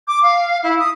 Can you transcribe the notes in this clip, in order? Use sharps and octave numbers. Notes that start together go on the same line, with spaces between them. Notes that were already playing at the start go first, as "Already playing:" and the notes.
D6
F5
E4
D#6